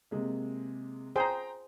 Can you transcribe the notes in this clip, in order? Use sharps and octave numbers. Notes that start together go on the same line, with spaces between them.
C3 G#3 A#3
G#4 C5 G5 A#5